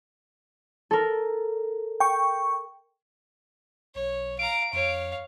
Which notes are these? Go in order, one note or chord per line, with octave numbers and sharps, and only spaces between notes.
A4 A#4
G5 C#6
B1 C#5
F5 A#5 D7
F2 C#5 F5